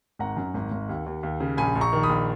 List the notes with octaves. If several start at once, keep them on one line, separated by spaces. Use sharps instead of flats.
G#1 F#5 A#5
F#2
G#1
G#1
D#2
D#2
D#2
C#3
A#1 G#5 B5
A#1
A#5 C#6
D#3
B5 D#6
A#1